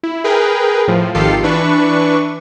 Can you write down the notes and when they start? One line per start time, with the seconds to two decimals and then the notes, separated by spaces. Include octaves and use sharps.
0.03 E4
0.24 G#4 A#4 B4 G5
0.88 A2 F3
1.15 G#1 D#3 F4 G4 A4 C7
1.43 E3 D4 B4 C#6